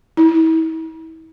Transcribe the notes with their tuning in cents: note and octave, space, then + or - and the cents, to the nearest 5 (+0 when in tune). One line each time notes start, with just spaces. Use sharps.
E4 -40